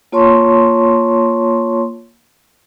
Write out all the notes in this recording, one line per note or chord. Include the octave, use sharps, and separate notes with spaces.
A#3 F4 C#5 A5 C6 C#6